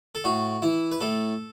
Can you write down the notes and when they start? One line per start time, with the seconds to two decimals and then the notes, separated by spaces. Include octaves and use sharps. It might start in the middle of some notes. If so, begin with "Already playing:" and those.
0.15 A4
0.24 A2 F#4
0.62 E3 E4
0.92 B4
1.01 A2 A4